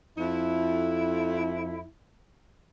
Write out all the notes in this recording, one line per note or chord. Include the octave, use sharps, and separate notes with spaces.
F2 E4